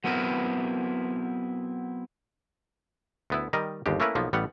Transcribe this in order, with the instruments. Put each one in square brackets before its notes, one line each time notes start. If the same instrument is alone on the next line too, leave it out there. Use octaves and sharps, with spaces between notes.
[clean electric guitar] F#3 B3 C4 E4 A#4 B4
[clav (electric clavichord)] D2 B3 E4
D#3 G3 A#4 D#5
G1 D#2 G#3 G4
A3 A#3 C#4 E4 A#4 B4
B1 F3 A#3 B3
A1 G3 B3 C#5 F#5